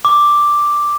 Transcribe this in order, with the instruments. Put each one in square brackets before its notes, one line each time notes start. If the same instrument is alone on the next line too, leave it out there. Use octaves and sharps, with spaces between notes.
[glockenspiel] D6